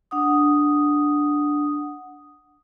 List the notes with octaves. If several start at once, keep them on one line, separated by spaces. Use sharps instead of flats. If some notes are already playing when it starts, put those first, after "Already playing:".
D4 F#5 D#6